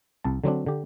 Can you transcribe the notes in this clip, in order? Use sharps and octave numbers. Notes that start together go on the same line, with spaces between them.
C2 A5
D3 F#3 C4 D4
D3 G4